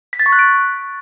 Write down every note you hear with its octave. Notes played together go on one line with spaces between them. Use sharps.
B6
A6
C#6
F#6
D7